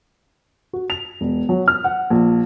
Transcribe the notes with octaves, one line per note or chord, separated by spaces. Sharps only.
F#4
F7
E1
F#3
F6
F#5
A#1